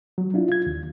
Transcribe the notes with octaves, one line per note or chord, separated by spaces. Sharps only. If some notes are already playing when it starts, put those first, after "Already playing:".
F#3
D4 E4 F4
F4 G#6
D#2